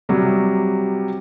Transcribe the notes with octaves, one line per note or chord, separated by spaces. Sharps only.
C3 F#3 G3